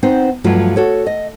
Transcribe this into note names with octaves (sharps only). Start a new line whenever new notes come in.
B3 C4 D#4 C5
G2 F3 F#3 A3 F4
F#4 A4 C#5
D#5